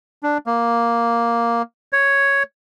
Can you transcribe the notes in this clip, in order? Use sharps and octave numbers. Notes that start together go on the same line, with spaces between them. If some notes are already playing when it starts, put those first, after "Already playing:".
D4
A#3
C#5